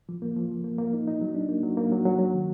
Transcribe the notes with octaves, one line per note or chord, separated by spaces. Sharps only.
F3
A#3
F3
F3
A#3
A#3
D#4
D#4
F#3
D4
A#3
F#3
A#3
F#3
F#3
F#3
D#3